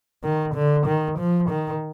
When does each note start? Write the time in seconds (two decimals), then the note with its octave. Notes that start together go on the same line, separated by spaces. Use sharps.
0.23 D#3
0.54 D3
0.86 D#3
1.18 F3
1.49 D#3